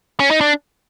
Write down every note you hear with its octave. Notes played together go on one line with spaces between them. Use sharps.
C#4
D#4
D4